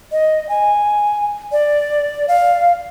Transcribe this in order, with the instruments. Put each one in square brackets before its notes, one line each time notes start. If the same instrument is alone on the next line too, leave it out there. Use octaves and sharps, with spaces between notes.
[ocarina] D#5
G#5
D5
F5